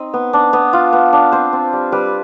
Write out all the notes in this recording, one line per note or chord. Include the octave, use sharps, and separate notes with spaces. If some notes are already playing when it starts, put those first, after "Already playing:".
Already playing: C4 D#4 D#5
B3
D4
B3
F4
B3
D4
C4 C5
C4
G3
G3 B4